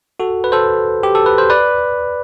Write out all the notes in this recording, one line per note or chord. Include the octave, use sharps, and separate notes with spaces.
F#4 A4
B4
A4 C5
G4
A4
B4
C5
B4 D5